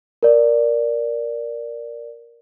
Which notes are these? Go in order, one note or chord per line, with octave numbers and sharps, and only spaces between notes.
A#4 D5